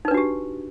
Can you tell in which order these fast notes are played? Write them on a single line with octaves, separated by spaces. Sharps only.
D#4 B4 D4 F#4 G4